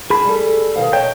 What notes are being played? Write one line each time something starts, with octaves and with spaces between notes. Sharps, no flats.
G#4 A5 B5
G3 A4
B2 D#3 F5
C#5 D#5 G5 A5